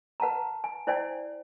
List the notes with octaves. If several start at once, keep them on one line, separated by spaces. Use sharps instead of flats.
B4 F#5 A5 A#5
G#5
E4 C5 D5 G5 G#5